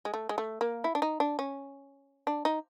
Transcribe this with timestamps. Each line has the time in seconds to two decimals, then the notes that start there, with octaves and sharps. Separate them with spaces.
0.05 G#3
0.14 A3
0.29 G#3
0.38 A3
0.61 A#3
0.84 E4
0.95 D4
1.02 D#4
1.20 D4
1.39 C#4
2.27 D4
2.45 D#4